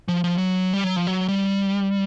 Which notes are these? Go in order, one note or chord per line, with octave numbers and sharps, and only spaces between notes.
F3
F3
F#3
G3
F#3
F3
F#3
G3